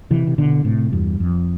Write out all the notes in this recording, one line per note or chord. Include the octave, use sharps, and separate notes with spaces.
C3 E3
C3
B2 D3
A2 C3
E2 G2
F2